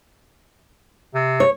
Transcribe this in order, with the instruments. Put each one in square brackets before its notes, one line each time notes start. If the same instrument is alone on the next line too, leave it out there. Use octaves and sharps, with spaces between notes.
[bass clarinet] C3
[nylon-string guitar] C#5